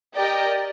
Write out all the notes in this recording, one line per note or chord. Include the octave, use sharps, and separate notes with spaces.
G4 A#4 D5 D#5 G5